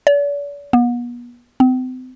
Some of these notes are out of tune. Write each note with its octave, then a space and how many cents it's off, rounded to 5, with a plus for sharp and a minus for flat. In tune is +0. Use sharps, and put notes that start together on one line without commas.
D5 -45
B3 -40
C4 -40